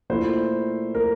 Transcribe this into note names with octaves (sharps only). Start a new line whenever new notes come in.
A#2 A3 E4 C5
A#4